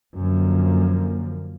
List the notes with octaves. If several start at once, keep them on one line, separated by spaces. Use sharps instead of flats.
F#2 D3 F3 A#3